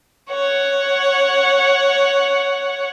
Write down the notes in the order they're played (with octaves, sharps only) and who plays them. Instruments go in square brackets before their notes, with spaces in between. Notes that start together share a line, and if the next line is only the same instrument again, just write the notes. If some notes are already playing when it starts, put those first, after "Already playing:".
[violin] C#5 F#5